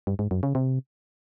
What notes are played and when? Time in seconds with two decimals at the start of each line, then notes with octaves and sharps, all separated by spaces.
0.07 G2
0.19 G#2
0.31 F#2
0.43 C#3
0.55 C3